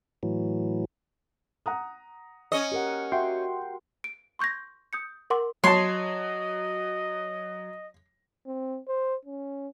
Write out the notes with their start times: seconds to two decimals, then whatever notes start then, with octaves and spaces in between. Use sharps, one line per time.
0.23 A2 E3 F#3
1.66 F#5 A#5 D#6
2.52 C#4 D#5
2.72 G4 A#4 F#5
3.12 F#4 E5 G5 C6
4.04 D7
4.39 C6 C#6 G6 G#6 A#6
4.93 D#6 G6 C#7
5.30 A#4 F#5 C6 D6
5.64 F#3 C#5 D#5 A5 C6
8.46 C4
8.88 C5
9.25 C#4